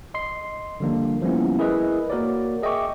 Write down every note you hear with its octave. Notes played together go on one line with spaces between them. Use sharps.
D#5 C6 C7
D3 F3 G3 A#3 D4
F3 G3 A#3 B3 C#4 E4
E4 G#4 A#4 B4 D#5 E5
A#3 F#4 A#4 C#5 D5
G#4 D#5 E5 G5 C#6 D6